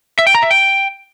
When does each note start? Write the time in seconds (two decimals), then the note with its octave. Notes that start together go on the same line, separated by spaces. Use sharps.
0.19 E5
0.27 G5
0.35 A#5
0.43 E5
0.51 G5